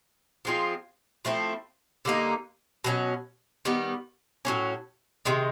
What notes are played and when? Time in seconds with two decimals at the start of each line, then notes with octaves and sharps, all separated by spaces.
0.45 F3 G#3 C4 F4
1.25 F3 A3 C4 E4
2.05 D3 G3 A#3 D#4
2.84 B2 F#3 A#3 C#4
3.65 D#3 G3 B3
4.45 A2 F#3 A#3 C#4
5.25 C3 D#3 G#3